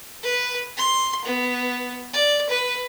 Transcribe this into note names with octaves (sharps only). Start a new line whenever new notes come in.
B4
C6
B3
D5
B4